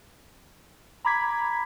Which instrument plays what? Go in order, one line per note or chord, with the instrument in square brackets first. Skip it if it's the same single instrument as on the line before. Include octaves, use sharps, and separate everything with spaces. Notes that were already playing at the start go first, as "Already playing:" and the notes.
[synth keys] A#5 B5 D6 G#6 B6